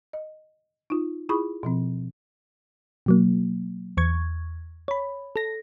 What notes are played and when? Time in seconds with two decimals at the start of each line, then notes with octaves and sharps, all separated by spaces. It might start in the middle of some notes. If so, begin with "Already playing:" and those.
0.13 D#5
0.90 D#4 F4
1.29 E4 F4 G#4 B5 C#6 D#6
1.63 B2 F3 C4
3.06 B2 F#3 A#3
3.97 E2 C#6 G#6
4.88 C#5 B5
5.36 A4 A#6